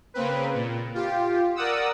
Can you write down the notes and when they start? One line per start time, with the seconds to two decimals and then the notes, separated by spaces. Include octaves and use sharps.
0.14 C#3 A#3 C4 B4
0.54 A#2
0.94 F4 G4
1.55 A#4 D5 F#5 D#6 E6